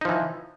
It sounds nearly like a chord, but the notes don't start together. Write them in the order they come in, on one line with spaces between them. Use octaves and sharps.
D#4 F3 E3